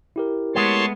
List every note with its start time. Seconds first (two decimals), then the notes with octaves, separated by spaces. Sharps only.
0.16 E4 G4 A#4
0.55 G#3 A3 B3 C#5 A5 C6